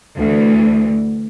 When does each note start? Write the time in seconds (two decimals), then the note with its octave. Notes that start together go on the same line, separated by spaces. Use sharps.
0.17 D2 E3